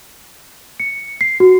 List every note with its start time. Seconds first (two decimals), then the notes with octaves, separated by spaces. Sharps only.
0.80 C#7
1.21 C7
1.40 F#4